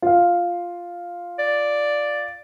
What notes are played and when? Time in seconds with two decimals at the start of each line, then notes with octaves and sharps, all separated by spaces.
0.02 F4 F5
1.39 D5